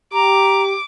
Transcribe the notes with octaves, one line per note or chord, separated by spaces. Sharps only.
G4 A#5 D6